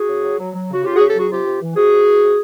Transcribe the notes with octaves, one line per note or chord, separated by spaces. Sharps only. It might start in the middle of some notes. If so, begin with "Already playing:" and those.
Already playing: F#4 G#4
C#3
F#3
F#3
F#3
C#3 F#4
C#3 F4 G4
F#4 G#4
C#3
G4 A4
F#3 F#4 G#4
C3 F4 G4
C3
E3
C3 F#4 G#4
C3
E3
C3